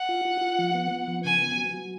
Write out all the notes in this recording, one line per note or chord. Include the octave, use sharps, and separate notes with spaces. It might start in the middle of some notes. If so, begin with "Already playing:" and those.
Already playing: F#5
F4
F4
F4
F3
B3
B3
F3
C#3 G#5
B3
F#3
F#3